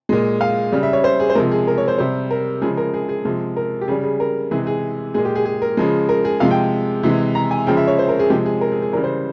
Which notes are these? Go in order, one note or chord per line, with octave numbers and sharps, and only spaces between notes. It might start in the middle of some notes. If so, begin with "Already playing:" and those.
A#2 G#3
F5
C#3 G3
E5
C#5
C5
G#4
C5
C3 F3 G#3 A#4
G#4
A#4
C#5
C5
C3 G3 C5
A#4
C#3 F3 G#3 G#4
A#4
G#4
G#4
C3 F3 G#3
A#4
G4
C#3 G3 G#4
G#4
A#4
C3 E3 G#3 G#4
G#4
A#2 G#3 G#4
G4
G#4
G#4
A#4
C#3 F3 G#3
A#4
G#4
C3 F3 G#3 F5
G5
C3 E3 G#3
A#5
G#5
C#3 F3 G#3 G5
E5
C#5
C5
A#4
G#4
C3 F3 G#3 G4
G#4
A#4
G#4
G#4
C#3 E3 G3 A#4
C5